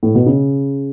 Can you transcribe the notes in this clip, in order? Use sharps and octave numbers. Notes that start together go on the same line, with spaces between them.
A2
B2
C#3